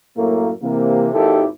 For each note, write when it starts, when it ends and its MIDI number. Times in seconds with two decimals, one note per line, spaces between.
0.17 0.51 42
0.17 0.51 45
0.17 0.51 57
0.17 0.51 58
0.62 1.09 48
0.62 1.09 52
0.62 1.09 58
1.14 1.45 32
1.14 1.45 39
1.14 1.45 44
1.14 1.45 64
1.14 1.45 67
1.14 1.45 69